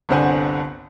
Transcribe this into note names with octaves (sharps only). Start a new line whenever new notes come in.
G1 C2 D3 C5 F#5 G#5